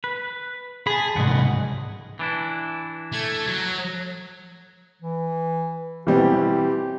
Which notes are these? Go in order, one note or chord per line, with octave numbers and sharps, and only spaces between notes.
B4
G#4 A5 B5
C2 G#2 D#5 F#5
E3 D4 E4
A3 G#6
F#3
E3
B2 E3 G3 C4 G4